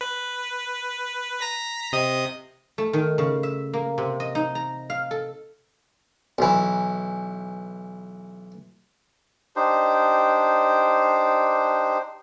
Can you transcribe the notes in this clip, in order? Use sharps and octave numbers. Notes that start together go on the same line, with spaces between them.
B4
A#5 A#6 B6
C3 D#5 D#6
A3
D#3
C#3
E5
A#3
C3
D#5
D#4
A#5
F5
A4
B1 E3
D4 D#4 G4 C5